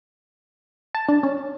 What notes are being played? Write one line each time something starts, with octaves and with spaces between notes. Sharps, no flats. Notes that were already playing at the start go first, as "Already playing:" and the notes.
A5
D4
C#4